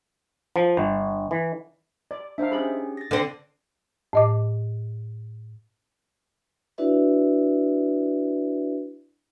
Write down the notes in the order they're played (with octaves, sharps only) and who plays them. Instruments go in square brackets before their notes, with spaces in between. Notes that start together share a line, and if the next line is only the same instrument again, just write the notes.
[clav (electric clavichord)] F3
G1
E3
[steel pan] D5
[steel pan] D4 F5 [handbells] D#4 C5 E5
[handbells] C#4 G4 G#4 [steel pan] B5
[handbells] A6 A#6
[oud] D3 C4
[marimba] A2 D#5 D6
[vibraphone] D4 E4 F#4 B4 D5 E5